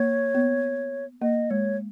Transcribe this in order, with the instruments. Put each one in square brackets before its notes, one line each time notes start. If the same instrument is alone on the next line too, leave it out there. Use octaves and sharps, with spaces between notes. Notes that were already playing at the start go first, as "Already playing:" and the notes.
Already playing: [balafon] A#3 [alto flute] C#5
[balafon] B3
[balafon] A#3 [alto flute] D#5
[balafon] G#3 [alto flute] C#5